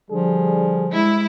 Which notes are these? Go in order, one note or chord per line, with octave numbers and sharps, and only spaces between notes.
D3 F3 G3 G#4
G#3 E4